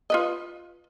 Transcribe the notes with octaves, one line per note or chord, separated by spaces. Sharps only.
F4 B4 D#5